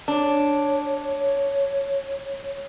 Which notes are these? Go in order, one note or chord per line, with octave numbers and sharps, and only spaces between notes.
D4 C#5